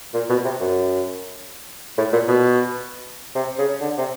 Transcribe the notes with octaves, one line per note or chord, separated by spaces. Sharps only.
A#2
B2
C3
F#2
A2
A#2
B2
C3
C#3
D3
C3